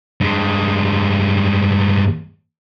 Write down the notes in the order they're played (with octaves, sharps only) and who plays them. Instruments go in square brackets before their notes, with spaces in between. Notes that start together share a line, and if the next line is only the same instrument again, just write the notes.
[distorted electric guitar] G2 G#3